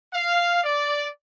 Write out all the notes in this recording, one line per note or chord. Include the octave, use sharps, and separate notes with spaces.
F5
D5